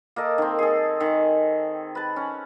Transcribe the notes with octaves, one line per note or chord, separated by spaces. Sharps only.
A#3 A4 D#5
D#3 C4
G#4 A4
D#3
B4 A5
C#4